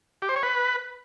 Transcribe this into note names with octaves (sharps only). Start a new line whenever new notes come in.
G4
C5
C#5
B4